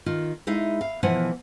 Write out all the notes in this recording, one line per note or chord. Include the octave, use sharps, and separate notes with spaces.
D#3 F4
G#3 D#4 E4 F5
F5
B2 E3 F3 A#3 F#5 G#5